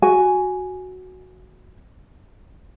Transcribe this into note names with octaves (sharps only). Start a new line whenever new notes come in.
F#4 G#5